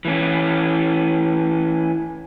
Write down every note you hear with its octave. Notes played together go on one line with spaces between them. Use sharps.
E3 C#4